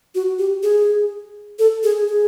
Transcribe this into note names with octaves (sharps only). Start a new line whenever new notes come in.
F#4
G4
G#4
A4
G#4
G#4